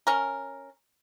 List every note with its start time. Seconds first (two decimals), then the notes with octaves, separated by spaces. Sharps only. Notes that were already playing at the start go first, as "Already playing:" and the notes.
0.07 C#4 A#4